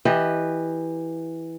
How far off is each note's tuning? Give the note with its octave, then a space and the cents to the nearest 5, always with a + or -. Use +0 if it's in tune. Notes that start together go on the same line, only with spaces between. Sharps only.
E3 -5 G4 +0 D#5 -15